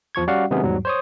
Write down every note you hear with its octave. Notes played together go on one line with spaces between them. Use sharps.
E2 F3 C#6 G#6
G3 C#4 F#4 D5 F5 F#5
C3 D#3 F#3 G#3 B3 C#4
E2 G#2 F#3 G3
C5 C#5 D#6